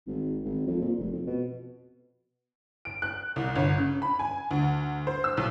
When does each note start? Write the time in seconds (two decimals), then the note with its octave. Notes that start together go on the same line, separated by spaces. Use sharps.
0.07 G#1
0.45 G#1
0.67 F2
0.81 A#2
0.99 F1
1.12 F2
1.27 B2
2.85 D7
3.02 F#6
3.36 C2
3.55 G1
3.78 C#3
4.02 B5
4.19 G#5
4.51 D2
5.07 C5
5.24 E6
5.37 B1